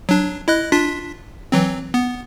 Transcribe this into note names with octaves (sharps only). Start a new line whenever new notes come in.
F#3 D4
E4 D#5 F#6
D4 F4 B6
E3 F#3 C4
B3